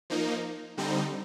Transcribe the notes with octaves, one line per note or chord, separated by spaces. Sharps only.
F3 A#3 D#4
D3 G3 C4 D#4